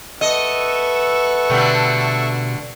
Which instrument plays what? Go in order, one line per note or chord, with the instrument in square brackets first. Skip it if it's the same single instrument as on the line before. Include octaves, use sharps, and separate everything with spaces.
[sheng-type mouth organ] A4 E5 C#6 [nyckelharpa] B4 F#5 [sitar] D#5
[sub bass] B2 [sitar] D3 G3 A3